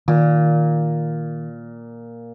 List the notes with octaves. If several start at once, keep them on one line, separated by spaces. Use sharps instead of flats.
A#2 D#3